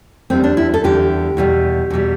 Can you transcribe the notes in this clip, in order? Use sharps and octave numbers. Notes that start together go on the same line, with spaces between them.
E2 D3 G3 C4
D4
E4
A4
E2 D3 G3 G4
E2 B2 G3
E2 B2 G3